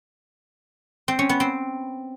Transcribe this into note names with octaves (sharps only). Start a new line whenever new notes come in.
C4
C#4
B3
C4